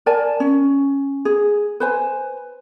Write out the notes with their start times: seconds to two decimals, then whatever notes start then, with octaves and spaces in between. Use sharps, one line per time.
0.06 A#4 D5 G#5 A5
0.40 C#4
1.25 G#4
1.80 B4 C5 G#5